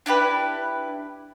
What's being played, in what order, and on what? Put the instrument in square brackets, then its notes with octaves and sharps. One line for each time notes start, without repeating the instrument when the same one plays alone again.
[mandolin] D4 E4 G4 B4